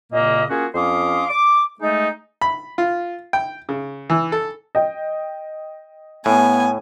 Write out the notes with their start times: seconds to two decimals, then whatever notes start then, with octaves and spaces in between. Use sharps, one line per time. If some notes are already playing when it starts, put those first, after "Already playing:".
0.12 C2 A#2 C#3 A#3 D#5
0.50 A#3 C#4 F4 F#4 G#4
0.75 F2 C#4 F5 C6 D6 D#6
1.29 D6
1.80 G#3 A3 D#4
2.41 B5
2.78 F4
3.33 G5
3.69 C#3
4.10 E3
4.32 A4
4.75 D#5 G5
6.26 A2 B3 G#5